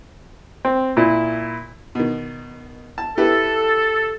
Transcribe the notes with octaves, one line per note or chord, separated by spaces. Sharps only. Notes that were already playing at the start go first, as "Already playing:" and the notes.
C4
A#2 E4
B2 D#3
A5
E4 G4 A4 B4